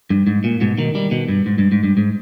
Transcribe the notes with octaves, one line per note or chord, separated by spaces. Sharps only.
G2
G#2
A#2
G#2 B2
B2 D#3
D#3 G3
B2 D#3
G2
G#2
G2
G#2
G2
G#2